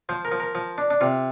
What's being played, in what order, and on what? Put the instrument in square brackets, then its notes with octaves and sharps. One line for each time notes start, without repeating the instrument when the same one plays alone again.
[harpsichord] F3 C5
A#4
F3
A#4
F3
D4
D4
C3 F4